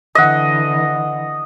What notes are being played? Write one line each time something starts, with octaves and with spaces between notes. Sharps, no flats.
D3 E3 D#5 F#5